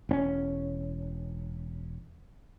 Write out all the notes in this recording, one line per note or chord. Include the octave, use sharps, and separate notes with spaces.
E1 C4 C#4